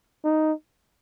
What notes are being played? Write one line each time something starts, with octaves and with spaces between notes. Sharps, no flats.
D#4